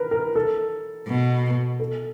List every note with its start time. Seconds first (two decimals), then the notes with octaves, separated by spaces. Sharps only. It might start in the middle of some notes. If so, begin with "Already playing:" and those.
Already playing: A#4 B4
0.11 A#4
0.36 A4
1.08 B2
1.80 A4